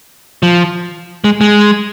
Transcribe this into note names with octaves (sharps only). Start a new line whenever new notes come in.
F3
G#3
G#3